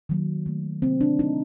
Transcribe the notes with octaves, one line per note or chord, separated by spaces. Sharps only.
D#3 F#3 A#3
D#3 A3
C3 F#3 A#3 C4
D4
D#3 F#3 A3 D#4